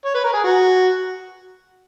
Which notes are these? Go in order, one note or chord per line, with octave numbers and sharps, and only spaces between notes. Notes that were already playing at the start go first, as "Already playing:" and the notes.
C#5
B4
A#4
G#4
F#4